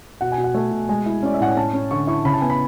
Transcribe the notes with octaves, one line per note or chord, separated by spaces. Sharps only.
B2 F#5
G#5
B2
F#5
A3
B2
G#3 G#5
E4
C#4 D5
E5
A2 F#5
G#5
C#4 A5
C#4
D3 C#6
E4 C#6
C#3 B5
A5
B3 G#5
B5